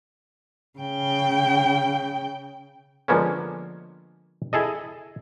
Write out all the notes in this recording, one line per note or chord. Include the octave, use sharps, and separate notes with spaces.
C#3 G5
D3 F3 G#3 A#3 B3 C#4
E4 G#4 A4 D#5